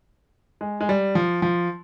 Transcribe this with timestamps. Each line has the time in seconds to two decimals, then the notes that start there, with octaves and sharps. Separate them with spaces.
0.61 G#3
0.81 G#3
0.89 G3
1.15 F3
1.42 F3